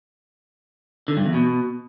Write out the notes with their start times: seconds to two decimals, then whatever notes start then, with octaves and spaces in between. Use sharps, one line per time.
1.08 D3
1.17 G2
1.26 E2
1.34 B2